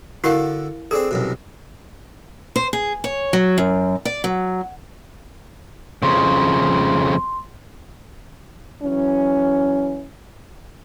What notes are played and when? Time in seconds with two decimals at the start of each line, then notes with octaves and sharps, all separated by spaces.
0.24 D3 E4 F#4 A4 A#4 F5
0.91 C4 D4 G#4 A4
1.11 C2 F#2 B2
2.56 C5
2.73 G#4
3.04 C#5
3.33 F#3
3.58 F#2
4.05 D5
4.24 F#3
6.03 F2 C#3 C6
8.83 E3 F#3 C#4